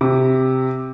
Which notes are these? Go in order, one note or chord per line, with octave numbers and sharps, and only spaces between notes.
C3